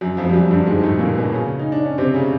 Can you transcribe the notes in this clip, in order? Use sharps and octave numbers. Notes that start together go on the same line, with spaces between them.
F#2 F#3
F2 F3
G3
F#2 F#3
G2 G3
G#2 G#3
A2 A3
A#2 A#3
B2 B3
C#3 C#4
D#4
D4
C#4
C3 C4
C#3 C#4